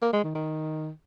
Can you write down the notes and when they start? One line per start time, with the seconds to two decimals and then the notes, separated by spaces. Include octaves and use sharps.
0.02 A#3
0.13 G#3
0.24 D#3
0.35 D#3